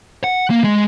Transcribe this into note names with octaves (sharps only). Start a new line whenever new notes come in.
F#5
A#3
G#3